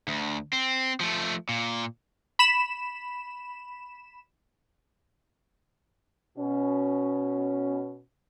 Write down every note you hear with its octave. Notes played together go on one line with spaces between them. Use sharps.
D2
C4
F3 A3
A#2
B5 E7
B2 C#4